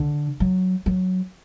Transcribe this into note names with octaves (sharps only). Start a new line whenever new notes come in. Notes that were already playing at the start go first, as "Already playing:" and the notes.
Already playing: D3
F#3
F#3